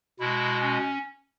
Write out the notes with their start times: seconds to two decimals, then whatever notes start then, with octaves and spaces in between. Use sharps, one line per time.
0.19 B2 G#3 E4
0.61 C#4